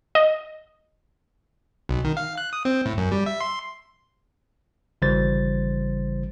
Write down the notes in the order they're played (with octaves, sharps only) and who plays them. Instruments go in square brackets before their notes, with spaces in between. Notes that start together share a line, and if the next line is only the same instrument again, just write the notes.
[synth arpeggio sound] D#5
[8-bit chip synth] B1
D#3
F5
F#6
D#6
C4
A2
F#2
G3
E5
C6
[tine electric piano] G#1 C#3 E3 G3 C5 A6